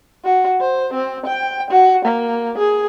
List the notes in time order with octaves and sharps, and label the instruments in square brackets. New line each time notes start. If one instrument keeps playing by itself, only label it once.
[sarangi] F#4
C5
C4
G5
F#4
A#3
G#4